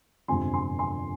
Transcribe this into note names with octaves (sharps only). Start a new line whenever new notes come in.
G1 F2 C3 F3 G#3 G#5 C6
G#5 C6
G#5 C6